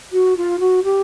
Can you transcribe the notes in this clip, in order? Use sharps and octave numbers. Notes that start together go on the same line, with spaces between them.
F#4
F4
F#4
G4